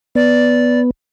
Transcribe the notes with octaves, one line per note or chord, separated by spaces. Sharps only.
B3 D5